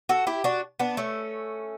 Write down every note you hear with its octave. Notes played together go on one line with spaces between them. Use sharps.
F#4 A4
E4 G4
D4 F#4
B3 D4
A3 C#4